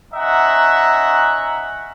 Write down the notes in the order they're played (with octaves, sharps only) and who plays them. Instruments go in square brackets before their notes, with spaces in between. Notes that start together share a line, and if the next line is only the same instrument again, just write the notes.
[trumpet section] C#4 D#4 D#5 E5 F#5 A#5